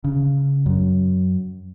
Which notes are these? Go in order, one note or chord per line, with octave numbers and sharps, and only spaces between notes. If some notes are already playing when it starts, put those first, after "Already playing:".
C#3
F#2